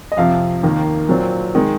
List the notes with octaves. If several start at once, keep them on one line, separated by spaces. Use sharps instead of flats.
D#5
F2 C3 F3 F5
D#2 D#3 A#3
A#2 F#3 C4
D#3 G#3